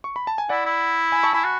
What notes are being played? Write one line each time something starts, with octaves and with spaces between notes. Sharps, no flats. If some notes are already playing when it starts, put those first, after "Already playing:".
C#6
B5
A5
G#5
E4 D5 F#5
E4
G#5 B5
A5 C#6
E4 G#5 B5
F#4